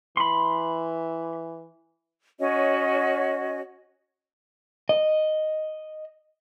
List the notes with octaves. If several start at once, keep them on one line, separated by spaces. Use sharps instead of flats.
E3 B5 C6
C#4 F#4 C#5 D#5
D#5